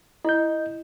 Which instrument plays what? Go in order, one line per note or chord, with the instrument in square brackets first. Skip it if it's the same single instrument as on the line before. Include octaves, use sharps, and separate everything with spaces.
[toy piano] E4 [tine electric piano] D#5 G6